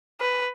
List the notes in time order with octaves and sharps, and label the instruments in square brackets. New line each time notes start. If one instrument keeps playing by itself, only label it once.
[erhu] B4